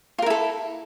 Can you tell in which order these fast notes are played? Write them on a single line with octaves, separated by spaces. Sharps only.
F4 A#4 E4 A4